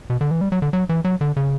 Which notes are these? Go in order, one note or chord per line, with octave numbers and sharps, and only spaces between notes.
B2
D3
E3
G3
F#3
D3
F#3
E3
F#3
D3
C#3